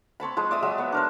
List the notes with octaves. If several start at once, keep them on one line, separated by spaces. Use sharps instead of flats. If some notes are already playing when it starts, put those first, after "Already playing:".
C4 C#5 A5 B5
F3 G#3 C5
D5 E5 D#6
F#3 G#3 E5
B3 C#5
D4 A#4 C5